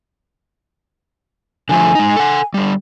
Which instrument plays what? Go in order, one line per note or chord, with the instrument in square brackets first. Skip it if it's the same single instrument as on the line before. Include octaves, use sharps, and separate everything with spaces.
[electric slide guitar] D3 F3 A3 [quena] G#5
[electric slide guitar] G#3 D#4
A4 F#5
D3 G3